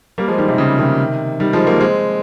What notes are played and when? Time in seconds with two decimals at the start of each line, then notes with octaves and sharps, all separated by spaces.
0.18 G3 A#3
0.28 F3 G#3
0.38 D#3 G3
0.48 C3 D#3
0.58 C#3
0.79 C3 D#3
1.40 D#3 G3
1.53 F3 G#3
1.67 G3 A#3
1.81 G#3 C4